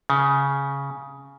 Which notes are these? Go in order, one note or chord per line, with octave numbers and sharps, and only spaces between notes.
C#3